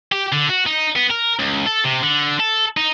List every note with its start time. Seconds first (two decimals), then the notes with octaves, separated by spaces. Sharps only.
0.12 G4
0.32 D3
0.49 F#4
0.66 D#4
0.96 B3
1.10 A#4
1.39 C#2
1.66 A4
1.84 C3
2.03 D3
2.40 A4
2.77 D#4